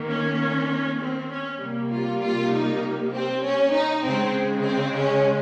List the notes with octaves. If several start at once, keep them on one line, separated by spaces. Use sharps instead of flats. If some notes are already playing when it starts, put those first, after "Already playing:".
Already playing: D#3 A#3
C#4
C4
C#4
C3 G3 A#3
F4
F4
D#4
C4
C#4
D#4
C#3 G#3 C4
C4
C#4